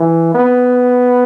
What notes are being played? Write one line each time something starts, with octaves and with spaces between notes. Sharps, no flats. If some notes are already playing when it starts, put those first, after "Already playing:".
Already playing: E3
B3